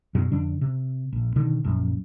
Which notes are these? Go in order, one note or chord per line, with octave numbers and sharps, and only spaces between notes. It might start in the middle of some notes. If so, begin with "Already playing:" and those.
F#2 B2 F#3
F2 D3 D4
C3
A#1
B2 D3 D#3
A#1 F#2